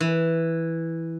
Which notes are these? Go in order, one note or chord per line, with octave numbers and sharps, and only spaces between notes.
E3